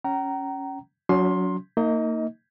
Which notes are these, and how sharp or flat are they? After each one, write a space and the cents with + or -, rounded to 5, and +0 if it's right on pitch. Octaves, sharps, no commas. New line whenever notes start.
C#4 +0 G5 -45 A#5 +0
F#3 -10 C#4 +40 C6 +15
A#3 -25 D#4 +15 D#5 +25